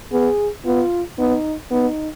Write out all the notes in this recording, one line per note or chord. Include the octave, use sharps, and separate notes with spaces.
B3 G#4
B3 F4
B3 D#4
B3 D#4